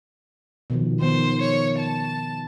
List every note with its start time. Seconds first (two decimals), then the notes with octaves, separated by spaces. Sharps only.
0.70 B2 D#3 F3
1.00 D#3 B3 C5
1.41 C#5
1.79 A5